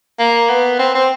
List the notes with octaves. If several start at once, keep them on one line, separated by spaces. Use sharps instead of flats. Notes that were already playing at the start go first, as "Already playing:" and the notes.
A#3
B3
C4
C4